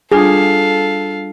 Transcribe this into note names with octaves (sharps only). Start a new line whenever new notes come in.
G3 D4 F4 G#4 A4 F5